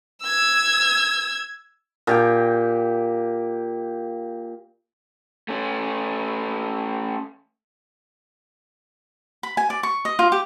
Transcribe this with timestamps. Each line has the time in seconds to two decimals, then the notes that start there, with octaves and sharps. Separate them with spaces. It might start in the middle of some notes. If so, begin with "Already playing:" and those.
0.23 E6 G#6
2.07 A#2 G4 G5
5.49 A3 C#4
9.43 B5
9.57 G#5
9.70 D5
9.83 C#6
10.05 D#5
10.19 F4
10.32 G4